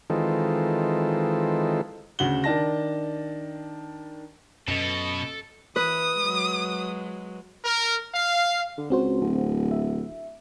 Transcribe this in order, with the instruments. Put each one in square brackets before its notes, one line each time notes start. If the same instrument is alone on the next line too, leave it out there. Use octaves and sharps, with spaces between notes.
[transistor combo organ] D#3 E3 G#3 C4 F4 A4
[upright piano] D2 C#3 F#4 F#7 G7
D#3 D4 A5 A#6
[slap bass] F#2 F#3 [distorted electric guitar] B2 [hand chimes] C#4 D#5 B6 [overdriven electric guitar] A4
[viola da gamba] E3 [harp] B4 [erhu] D#6
[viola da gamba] F#3 G#3
[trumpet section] A#4
F5
[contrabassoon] D3
[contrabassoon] C#2 [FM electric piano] C4 F#4 C5
[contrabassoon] D1
[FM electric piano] E5